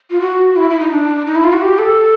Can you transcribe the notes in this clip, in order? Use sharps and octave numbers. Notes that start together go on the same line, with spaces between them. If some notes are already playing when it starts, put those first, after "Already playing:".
F4
F#4
E4
E4
D#4
D4
D#4
E4
F4
F#4
G4
A4